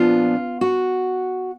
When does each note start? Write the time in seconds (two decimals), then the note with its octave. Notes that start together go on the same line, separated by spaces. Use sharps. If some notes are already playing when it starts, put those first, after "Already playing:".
Already playing: A#2 F3 B3 D4 F4
0.61 F#4